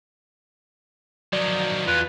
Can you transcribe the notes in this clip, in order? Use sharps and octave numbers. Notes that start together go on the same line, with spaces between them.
D#3 F3 F#3 D5
E2 F4 B4